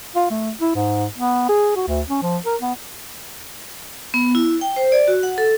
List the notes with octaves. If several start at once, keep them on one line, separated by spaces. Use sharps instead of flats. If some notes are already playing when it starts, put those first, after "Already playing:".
F4
A3
E4
G#2
B3
G#4
F#4
D2
C#4
F3
A#4
B3
B3
E4
G5
C5
D5
F#4
F#5
A4